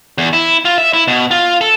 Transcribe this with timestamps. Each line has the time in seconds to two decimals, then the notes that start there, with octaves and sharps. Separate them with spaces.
0.18 E2
0.33 E4
0.65 F4
0.78 E5
0.94 E4
1.08 B2
1.31 F4
1.61 A4